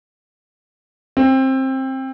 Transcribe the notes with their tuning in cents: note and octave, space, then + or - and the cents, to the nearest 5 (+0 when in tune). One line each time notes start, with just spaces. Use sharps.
C4 +20